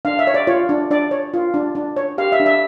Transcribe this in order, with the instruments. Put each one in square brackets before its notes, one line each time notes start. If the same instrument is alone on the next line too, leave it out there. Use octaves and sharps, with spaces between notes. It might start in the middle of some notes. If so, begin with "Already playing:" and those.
[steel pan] D4 F5
E5
C#5
D5
F4 C#5
D4
D4 D5
C#5
F4
D4
D4
C#5
G4 F5
E5
D4
E5